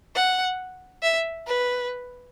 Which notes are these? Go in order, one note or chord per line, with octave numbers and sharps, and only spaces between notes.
F#5
E5
B4